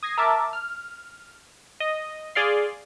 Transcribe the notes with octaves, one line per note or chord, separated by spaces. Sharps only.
D#6 G#6 A#6 C7 D#7
A#4 E5 A5 D6
F6
D#5
G#4 D5 F5 C6